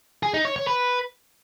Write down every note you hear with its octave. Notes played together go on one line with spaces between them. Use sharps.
G#4
D#4
C#5
C#5
B4